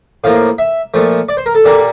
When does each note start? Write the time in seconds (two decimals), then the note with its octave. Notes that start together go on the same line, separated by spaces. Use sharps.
0.24 A2 F3 A#3 F5
0.59 E5
0.94 A#2 F3 A3
1.29 D5
1.37 C5
1.46 A#4
1.55 A4
1.65 A#2 G3 A#3